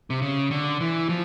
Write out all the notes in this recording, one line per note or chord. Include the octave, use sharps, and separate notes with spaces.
C3
C#3
D3
E3
F3